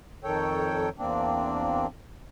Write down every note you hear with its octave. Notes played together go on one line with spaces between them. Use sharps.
F2 D#3 A4 C#5 G5
E2 A#3 C4 D4